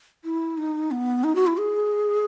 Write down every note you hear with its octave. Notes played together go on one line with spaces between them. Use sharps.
E4
D#4
B3
D#4
F#4
E4
G#4